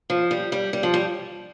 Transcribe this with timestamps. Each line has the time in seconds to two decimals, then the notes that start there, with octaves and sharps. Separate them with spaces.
0.10 F3
0.31 G3
0.52 G3
0.73 G3
0.83 F3
0.94 G3